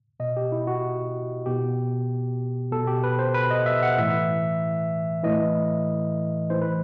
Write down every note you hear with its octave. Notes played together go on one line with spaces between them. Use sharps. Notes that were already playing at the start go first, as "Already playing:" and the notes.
B2 D#5
G4
E4
F#4
B2 G4
B2 A4
G4
B4
C5
B4
D#5
E5
F#5
A2 E3 E5
A2 E3 D#5
A2 E3 C5
B4